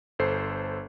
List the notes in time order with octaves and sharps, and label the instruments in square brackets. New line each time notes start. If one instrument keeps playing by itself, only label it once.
[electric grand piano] G1 A4 C5 C7